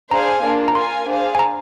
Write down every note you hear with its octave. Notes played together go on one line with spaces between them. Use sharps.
D4 G#4 C5 F5 G#5 A#5
A#3 D4 F4
A#5
F4 A#4 F5 G#5 C6
D4 G#4 C5 F5
G#5
A#5